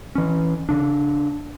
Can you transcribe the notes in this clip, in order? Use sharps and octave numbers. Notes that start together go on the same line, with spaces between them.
E3 C#4
C#3 D4